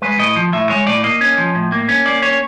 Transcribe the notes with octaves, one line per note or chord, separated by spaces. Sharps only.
G#3 B4
A2 D#5
F3
A2 E5
G#3 C#5
A2 D5
A#3 D#5
C#4
F3
A2
A#3
C#4
A#3 D5
C#4 C#5